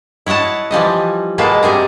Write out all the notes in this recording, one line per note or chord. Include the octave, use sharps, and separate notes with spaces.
E4 C#5 D#5 F#5 A5
E3 F3 G3 D#5
B2 G#3 A#3 B4 A5
C3 G3 G#4 A#4